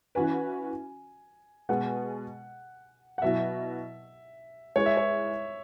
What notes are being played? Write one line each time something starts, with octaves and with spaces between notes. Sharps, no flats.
E3 C#4 F#4 B4 G#5
B2 G#3 B3 G#4 F#5
F#5
B2 F#3 E4 E5
G#3 E4 G#4 B4 C#5
E5
C#5